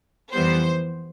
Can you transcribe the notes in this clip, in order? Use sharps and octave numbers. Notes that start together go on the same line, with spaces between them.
F2 E3 G3 B3 C5